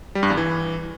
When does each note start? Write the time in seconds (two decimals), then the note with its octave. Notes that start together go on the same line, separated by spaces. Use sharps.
0.15 G3
0.23 G2
0.30 E2
0.37 E3